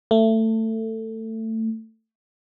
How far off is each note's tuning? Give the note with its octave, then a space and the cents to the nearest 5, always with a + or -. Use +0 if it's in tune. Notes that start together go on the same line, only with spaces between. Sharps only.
A3 +20